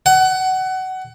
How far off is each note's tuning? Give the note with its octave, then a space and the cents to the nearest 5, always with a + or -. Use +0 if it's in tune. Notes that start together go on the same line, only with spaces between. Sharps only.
F#5 +25